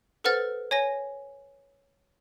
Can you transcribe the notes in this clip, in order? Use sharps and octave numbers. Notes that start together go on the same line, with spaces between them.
A4 B4 C5 F#5 F6 A6
C#5 G#5 A#6